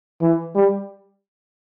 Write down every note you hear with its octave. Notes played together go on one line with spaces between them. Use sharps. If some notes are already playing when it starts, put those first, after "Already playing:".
E3
G3